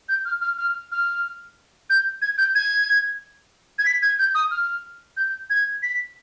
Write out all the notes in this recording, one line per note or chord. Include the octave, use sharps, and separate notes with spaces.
G6
F6
F6
F6
F6
G6
G#6
G6
G#6
G#6
B6
G#6
G6
D#6
F6
G6
G#6
B6